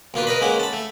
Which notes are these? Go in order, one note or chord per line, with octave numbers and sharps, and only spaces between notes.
B1 A#3 F4 B4
A#4 B4 D#5 B5
G#3 A#3 C#4 F#5
A5 B5
A3